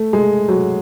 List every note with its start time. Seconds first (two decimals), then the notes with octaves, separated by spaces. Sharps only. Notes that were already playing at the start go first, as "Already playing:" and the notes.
Already playing: A3
0.13 G#3
0.48 F#3